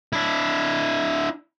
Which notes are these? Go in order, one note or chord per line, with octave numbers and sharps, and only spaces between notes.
D4 E4